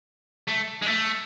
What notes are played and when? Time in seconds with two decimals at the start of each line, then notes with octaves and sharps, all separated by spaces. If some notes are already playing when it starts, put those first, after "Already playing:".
0.48 A3
0.82 G#3
0.87 A3